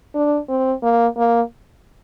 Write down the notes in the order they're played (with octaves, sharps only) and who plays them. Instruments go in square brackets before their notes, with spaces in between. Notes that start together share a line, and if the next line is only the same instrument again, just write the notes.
[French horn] D4
C4
A#3
A#3